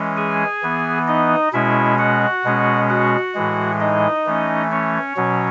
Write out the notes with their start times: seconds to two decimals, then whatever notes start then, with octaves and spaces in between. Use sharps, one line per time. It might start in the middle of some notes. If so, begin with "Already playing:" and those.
Already playing: E3 G#3 C#4
0.17 G#4 G#5
0.62 E3 B3
1.08 D#4 D#5
1.53 B2 G#3 C#4 E4 E5
1.99 F#4 F#5
2.44 B2 G#3 C#4
2.89 F#4 F#5
3.35 A2 E3 G#3
3.80 D#4 D#5
4.26 E3 A3 C#4
4.71 C#4 C#5
5.17 B2 F#3 C#4